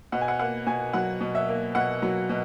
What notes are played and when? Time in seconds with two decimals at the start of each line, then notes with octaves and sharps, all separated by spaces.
0.12 B2 F#5
0.21 G#5
0.28 F#5
0.39 A#3 F#5
0.67 B2 G#5
0.93 F#3 F#5
1.20 B2
1.35 E5
1.49 A#3
1.75 B2 F#5
2.02 F#3
2.29 B2